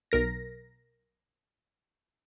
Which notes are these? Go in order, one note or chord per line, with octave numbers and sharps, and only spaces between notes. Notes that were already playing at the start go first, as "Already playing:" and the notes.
B1 A#4 A#6